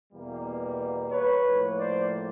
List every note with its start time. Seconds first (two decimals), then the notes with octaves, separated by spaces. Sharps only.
0.12 E2 B2 G3 A#3
1.11 B4 C#5
1.45 A2 F3 A#3
1.78 C5 D5